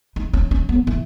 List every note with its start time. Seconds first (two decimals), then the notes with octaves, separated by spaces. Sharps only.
0.16 D#4
0.33 C#4
0.51 C#4
0.69 B3
0.87 E3